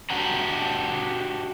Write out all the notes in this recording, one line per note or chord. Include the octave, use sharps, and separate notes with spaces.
D4 F#4 G4 F#5 A#5